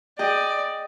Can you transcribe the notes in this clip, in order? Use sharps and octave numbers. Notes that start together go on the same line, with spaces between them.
G#4 D5 D#5 G5